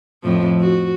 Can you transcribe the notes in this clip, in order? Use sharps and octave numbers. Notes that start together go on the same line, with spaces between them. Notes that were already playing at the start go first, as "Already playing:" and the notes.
F2 A2 F3
F#4